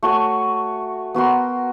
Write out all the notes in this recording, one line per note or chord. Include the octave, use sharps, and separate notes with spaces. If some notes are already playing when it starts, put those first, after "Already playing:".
A3 F#4 C#5 G#5
B3 F#4 A#4 C6